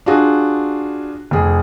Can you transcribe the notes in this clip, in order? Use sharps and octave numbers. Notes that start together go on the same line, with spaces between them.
D4 F4 F#4 G#4
F1 G#4